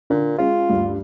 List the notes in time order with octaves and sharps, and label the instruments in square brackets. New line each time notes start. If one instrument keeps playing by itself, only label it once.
[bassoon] A#2 [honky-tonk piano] D3
[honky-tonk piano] G#3 C#4 [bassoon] F4
[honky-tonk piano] D2 G2